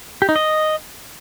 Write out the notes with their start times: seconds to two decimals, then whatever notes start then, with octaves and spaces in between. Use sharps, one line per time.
0.22 G4
0.29 D#4
0.36 D#5